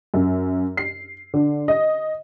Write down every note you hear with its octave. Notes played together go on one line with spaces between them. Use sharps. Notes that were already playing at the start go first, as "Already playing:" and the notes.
F#2
C7
D3
D#5